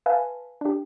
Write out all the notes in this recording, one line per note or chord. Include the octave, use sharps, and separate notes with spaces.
B4 E5 F5 G#5 A5
D4 G4